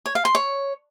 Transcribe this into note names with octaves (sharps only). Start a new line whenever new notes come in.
C#5
F5
C6
C#5